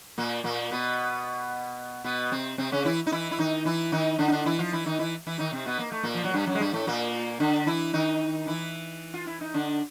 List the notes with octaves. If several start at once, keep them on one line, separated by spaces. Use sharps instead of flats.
A#2 A#3
A#2 A#3
B2 B3
B2 B3
C3 C4
C3 C4
C#3 C#4
E3 E4
D#4
E3 E4
E4
D#3 D#4
E3 E4
D#3 D#4
D3 D4
D#4
D3 D4
E3 E4
F3 F4
E3 E4
D#3 D#4
E3 E4
E3 E4
D#3 D#4
C3 C4
B2 B3
A#3
A3
A#2 A#3
F3
F#3
G2 G3
F#2 F#3
G#3
G2 G3
A2 A3
A#2 A#3
D3 D4
E3 E4
D#3 D#4
E3 E4
F4
E4
D#4
D3 D4